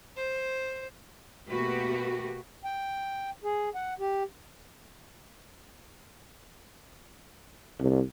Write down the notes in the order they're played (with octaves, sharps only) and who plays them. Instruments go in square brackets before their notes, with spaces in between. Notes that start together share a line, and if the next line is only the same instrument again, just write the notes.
[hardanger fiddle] C5
[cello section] B2 A3 A#3 F#4 G4 B4
[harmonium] G5
G#4
F#5
G4
[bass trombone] C2